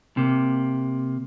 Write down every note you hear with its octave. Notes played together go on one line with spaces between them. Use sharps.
C3 A#3